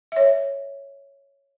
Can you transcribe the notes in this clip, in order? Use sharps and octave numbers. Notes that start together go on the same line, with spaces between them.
C#5 E5